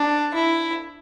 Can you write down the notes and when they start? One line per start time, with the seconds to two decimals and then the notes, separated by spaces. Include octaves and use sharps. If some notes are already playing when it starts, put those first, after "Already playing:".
Already playing: D4
0.34 E4